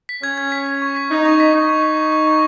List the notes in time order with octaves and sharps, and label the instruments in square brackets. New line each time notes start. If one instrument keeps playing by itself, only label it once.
[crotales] B6
[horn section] C#4 [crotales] G#6
[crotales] G#6
B6
G#6
C#6
B6
[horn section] D#4 [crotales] B6
[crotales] C#6
B6
[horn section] D#4 [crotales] C#6
[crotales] C#6
C#6
C#6
C#6
C#6